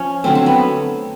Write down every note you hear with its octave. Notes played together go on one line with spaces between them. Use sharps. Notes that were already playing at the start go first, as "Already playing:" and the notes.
Already playing: F3 C#4
D3 F#3 A3 C4
C4
B3